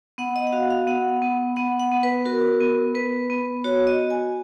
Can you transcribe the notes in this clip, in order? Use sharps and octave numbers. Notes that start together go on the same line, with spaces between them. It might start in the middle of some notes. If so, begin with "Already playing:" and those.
B3 F#5
D#5
F#5
F#4 F5
F5
B3 F#5
B3
B3 F#5
F#5
B3
B4
F#4 A#4
B3
B3 B4
B3
F#4 C#5
D#5
F#4
G#5